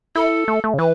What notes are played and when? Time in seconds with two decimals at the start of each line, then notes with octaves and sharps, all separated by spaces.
0.15 E4 A4
0.48 A3
0.64 A3
0.74 C#3
0.79 E3 B4